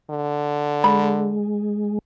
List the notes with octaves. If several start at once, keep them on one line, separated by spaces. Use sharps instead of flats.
D3
G#3 B5